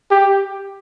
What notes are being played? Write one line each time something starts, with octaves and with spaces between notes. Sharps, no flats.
G4